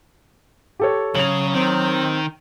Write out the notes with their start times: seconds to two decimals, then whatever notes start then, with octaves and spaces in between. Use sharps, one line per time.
0.80 G4 A4 C#5
1.15 C#3 F#3 C#5 F7 F#7
1.54 D#3 C4